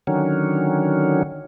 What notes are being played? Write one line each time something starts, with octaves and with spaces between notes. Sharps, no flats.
D3 D#3 F#3 C#4